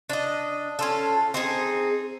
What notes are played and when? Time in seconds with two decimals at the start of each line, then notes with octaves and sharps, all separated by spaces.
0.10 D4 D#5
0.79 C#4 F4 A4
1.34 C4 D#4 G#4